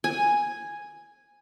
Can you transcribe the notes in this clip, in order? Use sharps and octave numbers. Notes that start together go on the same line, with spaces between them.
G#5